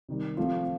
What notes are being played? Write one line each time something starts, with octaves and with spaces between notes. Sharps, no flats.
C3 D#3 G3
F3 A3 C4 F4